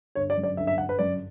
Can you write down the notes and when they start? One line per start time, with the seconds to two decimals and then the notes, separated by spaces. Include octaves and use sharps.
0.15 G1 C#5
0.30 D5
0.37 F#2
0.43 D5
0.57 G1 E5
0.67 E5
0.78 G1 F#5
0.89 B4
0.99 F#2 D5